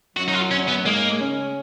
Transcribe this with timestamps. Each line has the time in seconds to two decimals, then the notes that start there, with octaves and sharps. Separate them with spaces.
0.16 F#2 F#3 F#4
0.28 D#4
0.34 F4
0.51 C#4
0.68 B3
0.86 G#2 G#3 A#3
1.20 C#3 C#4